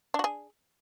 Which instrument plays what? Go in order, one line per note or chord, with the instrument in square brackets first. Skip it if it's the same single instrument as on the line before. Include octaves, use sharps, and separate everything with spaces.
[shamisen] D4
F#4
G#4